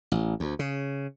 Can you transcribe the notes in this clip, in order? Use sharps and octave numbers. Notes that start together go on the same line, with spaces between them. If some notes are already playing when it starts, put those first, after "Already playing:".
A1
D2
C#3